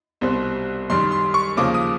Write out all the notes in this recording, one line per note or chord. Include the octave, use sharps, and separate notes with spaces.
C2 B2 G3 C4
F#2 D#3 G3 C6
C6
C#6
D#2 C#3 F3 A#3 D6
D#6